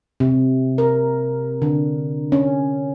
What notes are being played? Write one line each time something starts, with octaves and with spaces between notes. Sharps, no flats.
C3
A#4
D3
C#4